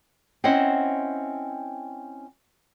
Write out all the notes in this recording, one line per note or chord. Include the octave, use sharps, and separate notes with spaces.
C4 C#4 E4 C5 D#5 F#5